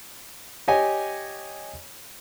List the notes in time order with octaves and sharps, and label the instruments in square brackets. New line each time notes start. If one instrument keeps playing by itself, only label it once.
[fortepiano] G4 C#5 D#5 G#5